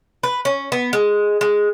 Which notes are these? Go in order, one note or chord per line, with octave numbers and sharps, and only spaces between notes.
B4
C#4
B3
G#3
G#3